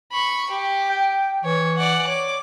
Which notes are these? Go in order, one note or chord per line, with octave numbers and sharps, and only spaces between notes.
B5 C#6
G4
G5
E3 C#5
D5 F#5
C#5 D6